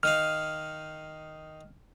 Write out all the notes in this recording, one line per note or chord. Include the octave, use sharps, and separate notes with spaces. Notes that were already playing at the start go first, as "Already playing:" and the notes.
D#3 D#4 F5 F6